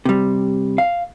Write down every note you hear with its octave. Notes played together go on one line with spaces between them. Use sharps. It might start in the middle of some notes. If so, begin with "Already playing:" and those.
C3 G3
F5